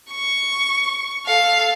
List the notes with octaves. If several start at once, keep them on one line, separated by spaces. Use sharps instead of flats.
C#6
A4 F5